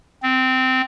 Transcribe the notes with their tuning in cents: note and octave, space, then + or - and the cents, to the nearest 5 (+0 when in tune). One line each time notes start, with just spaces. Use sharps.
C4 -15